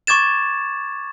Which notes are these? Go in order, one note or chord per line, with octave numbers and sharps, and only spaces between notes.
C#6 D6 G#6 A6 E7